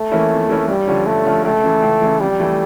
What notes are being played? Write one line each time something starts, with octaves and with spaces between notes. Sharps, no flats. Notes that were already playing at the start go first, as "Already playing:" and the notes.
Already playing: A3
E3 A#3 C#4 E4
F2
E3 A#3 C#4 E4
G2 G3
D3 F3 C#4
G2 A3
D3 F3 C#4
C#2 A3
C#3 E3
C#2
C#3 E3
F2 G3
E3 A3